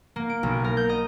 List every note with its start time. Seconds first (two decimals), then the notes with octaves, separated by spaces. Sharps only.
0.16 A#3
0.29 D7
0.43 B1
0.64 A#4
0.77 G6
0.89 D#5